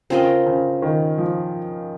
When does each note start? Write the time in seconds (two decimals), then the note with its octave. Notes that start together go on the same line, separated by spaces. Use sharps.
0.10 C#3 C4 F4 A#4 D#5
0.46 C#3
0.82 D#3
1.18 F3